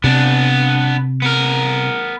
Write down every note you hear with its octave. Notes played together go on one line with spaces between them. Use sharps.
C3 B3 D4
B3 A#4